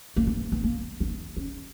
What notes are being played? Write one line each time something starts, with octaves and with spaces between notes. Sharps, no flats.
A#3
B3
B3
A#3
B3
C#4